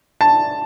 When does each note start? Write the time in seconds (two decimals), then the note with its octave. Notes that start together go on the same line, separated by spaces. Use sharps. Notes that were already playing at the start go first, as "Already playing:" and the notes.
0.21 A5